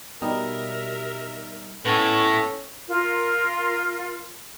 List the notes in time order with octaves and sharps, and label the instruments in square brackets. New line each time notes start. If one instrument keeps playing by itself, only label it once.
[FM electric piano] B2 G3 D#4 [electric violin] A#4 E5
[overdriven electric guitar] A2 [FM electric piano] B3 C#5 [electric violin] C#4 [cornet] A4
[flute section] F4 A#4